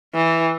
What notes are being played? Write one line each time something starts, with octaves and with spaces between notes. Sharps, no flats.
E3